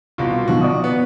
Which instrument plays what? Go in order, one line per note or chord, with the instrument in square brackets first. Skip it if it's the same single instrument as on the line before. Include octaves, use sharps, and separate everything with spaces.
[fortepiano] C2 B2 [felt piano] F4
[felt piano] B2 F3 [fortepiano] F#4
[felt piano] D5 C#6 D#6
[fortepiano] B3